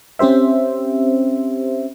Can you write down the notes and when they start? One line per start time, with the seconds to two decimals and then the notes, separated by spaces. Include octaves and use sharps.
0.19 C4 C#4 G4 C5 E5